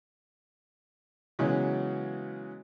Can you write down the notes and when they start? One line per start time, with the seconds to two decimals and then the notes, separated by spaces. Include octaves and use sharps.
1.39 C#3 E3 F#3 G#3 B3 C#4